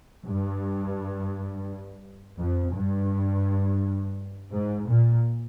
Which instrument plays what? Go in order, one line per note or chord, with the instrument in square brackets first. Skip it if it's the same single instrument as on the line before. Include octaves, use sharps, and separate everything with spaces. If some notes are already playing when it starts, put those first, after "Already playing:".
[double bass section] G2
F2
G2
G#2
A#2